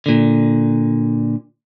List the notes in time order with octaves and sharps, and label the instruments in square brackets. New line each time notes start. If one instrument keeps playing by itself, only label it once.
[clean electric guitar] A#2 D3